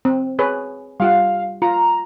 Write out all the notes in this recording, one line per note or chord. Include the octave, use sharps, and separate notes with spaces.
C4
G#4 B4 C#5
G3 F4 F5 F#5
F4 A#5